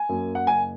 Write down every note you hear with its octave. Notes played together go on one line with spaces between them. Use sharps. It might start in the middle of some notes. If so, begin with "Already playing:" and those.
Already playing: G#5
F#2 F#3 A#3
F#5
F#1 G#5